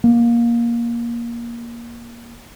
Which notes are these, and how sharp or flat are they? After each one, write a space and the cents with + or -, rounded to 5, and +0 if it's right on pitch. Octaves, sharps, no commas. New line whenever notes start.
A#3 +15